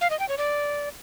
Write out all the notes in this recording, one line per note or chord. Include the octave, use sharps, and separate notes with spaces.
F5
D#5
G5
C#5
D5